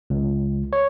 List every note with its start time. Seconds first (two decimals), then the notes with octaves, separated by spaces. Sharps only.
0.10 C#2
0.73 C#5